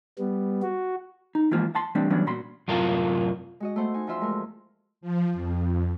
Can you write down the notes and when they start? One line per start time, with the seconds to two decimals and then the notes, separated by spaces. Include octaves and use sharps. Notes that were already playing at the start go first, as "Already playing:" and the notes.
0.19 G3 B3
0.62 F#4
1.35 D#4
1.51 E3 F3 G#3 A#3 F4 C5
1.75 F#5 A5 C6
1.95 E3 G3 A3 C4 D4
2.10 E3 F#3 G3 B3 C#4 D4
2.27 A#2 F#4 B5 C6
2.68 F#2 A2 C3 F4 A#4 A5
3.60 G#3 F#4 D#5
3.76 A3 B3 C5 F#5
3.94 D#4 G#5
4.07 E2 F3 F4 E5 C6
4.21 G#3 A3 G#4 A#4
5.01 F3
5.33 F2